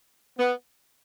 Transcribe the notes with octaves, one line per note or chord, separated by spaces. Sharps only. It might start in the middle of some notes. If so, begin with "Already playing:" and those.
B3